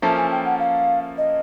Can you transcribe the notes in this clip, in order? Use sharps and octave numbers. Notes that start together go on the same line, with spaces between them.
F3 A#3 C#4 E4 A4 A5
G#5
G5
F#5
F5
D#5